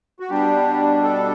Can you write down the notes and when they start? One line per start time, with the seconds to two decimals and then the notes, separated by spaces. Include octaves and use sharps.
0.20 F#4
0.30 B2 G3 D4 G4
1.03 A4